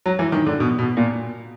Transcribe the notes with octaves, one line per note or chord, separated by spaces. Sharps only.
F#3
E3
D#3
D3
B2
B2
A#2